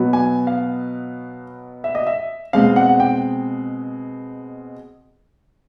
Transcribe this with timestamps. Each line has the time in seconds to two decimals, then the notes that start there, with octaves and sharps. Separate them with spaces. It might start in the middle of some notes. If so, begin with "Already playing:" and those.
Already playing: B2 F#3 B3
0.13 G#5
0.47 F5
1.84 E5
1.95 D#5
2.07 E5
2.53 B2 G#3 C4 F5
2.76 F#5
2.89 F#5
3.00 G5